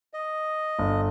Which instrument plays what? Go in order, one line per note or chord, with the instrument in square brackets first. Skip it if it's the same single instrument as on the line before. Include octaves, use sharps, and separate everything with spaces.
[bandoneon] D#5
[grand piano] G1